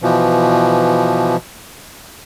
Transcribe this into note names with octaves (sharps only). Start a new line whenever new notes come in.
B2 E3 F3